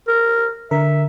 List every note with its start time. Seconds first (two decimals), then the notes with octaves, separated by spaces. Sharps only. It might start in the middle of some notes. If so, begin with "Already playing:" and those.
0.08 A#4
0.71 D3 A#4 E5